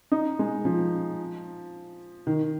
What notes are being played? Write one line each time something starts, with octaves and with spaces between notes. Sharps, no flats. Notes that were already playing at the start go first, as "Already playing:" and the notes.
D#4
G#3
F3
D#3